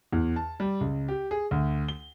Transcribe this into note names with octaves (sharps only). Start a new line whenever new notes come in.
E2
A5
G3
C#2
G4
G#4
D2
G7